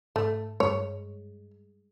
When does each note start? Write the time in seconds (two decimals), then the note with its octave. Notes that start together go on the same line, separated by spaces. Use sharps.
0.16 G#2 A3
0.60 G2 G#3 C#5